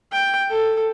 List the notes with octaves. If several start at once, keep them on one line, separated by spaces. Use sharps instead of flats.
G5
A4